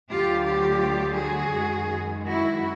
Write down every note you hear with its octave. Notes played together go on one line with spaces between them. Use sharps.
D2 D3 F#3 F4 G4
F4 G4
F#4 G#4
F#2 D#3 G#3
E4 F#4